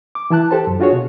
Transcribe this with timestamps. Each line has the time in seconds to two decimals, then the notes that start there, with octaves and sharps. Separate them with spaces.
0.15 D6
0.30 E3 E4 A5 F#6
0.51 G4 A4 C5 A5
0.67 F#2
0.80 D4 F4 F#4 G#4 C#5
0.93 B2